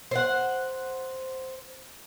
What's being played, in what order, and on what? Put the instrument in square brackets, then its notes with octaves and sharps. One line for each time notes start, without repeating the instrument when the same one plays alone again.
[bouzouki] C5 F#5